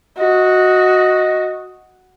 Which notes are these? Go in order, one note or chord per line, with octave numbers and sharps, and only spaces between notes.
F#4 D#5